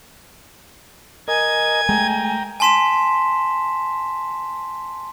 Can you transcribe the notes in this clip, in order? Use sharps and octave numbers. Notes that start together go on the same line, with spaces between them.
A#4 D#5 G#5 G#6
G#3 A3 G5 A#5
G#5 A5 C6 B6 E7